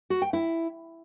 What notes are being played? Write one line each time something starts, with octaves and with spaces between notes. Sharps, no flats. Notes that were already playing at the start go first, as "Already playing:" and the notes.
F#4
G5
E4